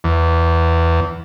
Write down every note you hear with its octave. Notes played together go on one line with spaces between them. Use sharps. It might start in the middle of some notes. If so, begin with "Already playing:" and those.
E2